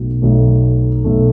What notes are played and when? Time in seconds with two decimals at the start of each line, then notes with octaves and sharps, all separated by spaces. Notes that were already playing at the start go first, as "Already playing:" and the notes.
Already playing: B1 B2 A3
0.22 B1 B2 A3
1.04 B1 B2 A3